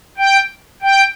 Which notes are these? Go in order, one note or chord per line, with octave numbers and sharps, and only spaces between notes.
G5
G5